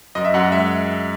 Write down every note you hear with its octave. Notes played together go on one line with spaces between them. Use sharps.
F#2 D#5
E5
F#2 F#5
G#3 E5